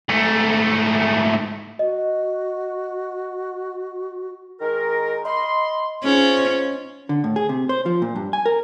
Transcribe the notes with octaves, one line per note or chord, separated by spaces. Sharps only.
G#2 A3
F#4 D#5
D#3 G#3 A#4
D#5 B5 C6
G#2 C#4 F4
D3
A2
G#4
C3
C5
F3
A#2
G2
G#5
A#4